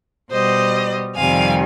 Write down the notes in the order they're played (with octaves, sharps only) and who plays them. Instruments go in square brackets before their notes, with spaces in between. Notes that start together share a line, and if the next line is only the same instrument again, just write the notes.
[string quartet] B2 G3 C5 D#5
F2 C3 D#3 G3 F5 G#5